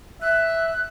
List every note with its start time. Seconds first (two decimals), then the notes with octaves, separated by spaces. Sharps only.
0.22 E5 F#6